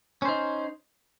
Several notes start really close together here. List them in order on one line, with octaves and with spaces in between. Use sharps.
C#4 C5 D#4